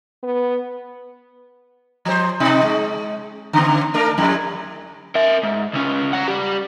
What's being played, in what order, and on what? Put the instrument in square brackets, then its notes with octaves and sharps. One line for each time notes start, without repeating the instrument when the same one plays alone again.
[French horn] B3
[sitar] F3 C5
B2 D#4
G#3
C#3 B3
A3 D4 A#4
F2 G3 E4
[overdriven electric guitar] A#4 E5
G#2
C#2 C#4
F#5 A#5
G3 G4